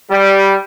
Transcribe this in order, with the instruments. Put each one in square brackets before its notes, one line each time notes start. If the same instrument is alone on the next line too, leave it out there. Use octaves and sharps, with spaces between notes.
[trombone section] G3